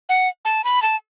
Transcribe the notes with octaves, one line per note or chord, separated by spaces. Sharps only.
F#5
A5
B5
A5